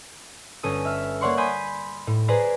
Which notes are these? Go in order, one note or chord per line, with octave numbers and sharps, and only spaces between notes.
G1 C#4 A4 D#6
E5 F6
A#3 C#5 D5 F#5 C6 C#6
G#5 B5 C6 D#6 G6
A2
G#4 B4 C5 D5 A#5